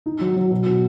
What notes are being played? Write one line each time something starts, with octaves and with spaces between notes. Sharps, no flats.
D#4
F#3
F#3
B2
B2